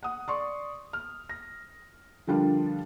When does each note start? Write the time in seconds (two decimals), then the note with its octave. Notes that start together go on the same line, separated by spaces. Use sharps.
0.03 F#5 D#6
0.28 D5 C6 C#6
0.93 F6
1.29 A#6
2.27 D3 F3 G3 D4 F4 A#4